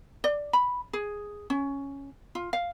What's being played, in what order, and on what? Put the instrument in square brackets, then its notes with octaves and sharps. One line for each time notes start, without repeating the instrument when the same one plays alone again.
[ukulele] D5
B5
G#4
C#4
F4
F5